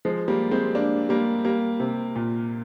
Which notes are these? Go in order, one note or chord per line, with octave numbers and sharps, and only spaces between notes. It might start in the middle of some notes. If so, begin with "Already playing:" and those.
F3 G#3
G3 A#3
G#3 C4
A#3 D4
G3 A#3
G3 A#3
C3
A#2